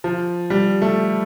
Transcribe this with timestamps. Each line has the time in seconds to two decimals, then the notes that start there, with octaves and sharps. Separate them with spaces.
0.04 F3
0.50 G3
0.82 A3